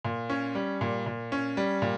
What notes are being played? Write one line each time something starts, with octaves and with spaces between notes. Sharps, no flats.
A#2
C#4
G3
A#2
A#2
C#4
G3
A#2